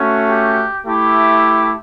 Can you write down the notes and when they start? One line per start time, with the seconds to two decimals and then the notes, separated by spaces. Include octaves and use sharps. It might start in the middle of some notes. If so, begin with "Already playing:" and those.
Already playing: A3 C#4 F#4
0.30 G4
0.84 A3 E4 G4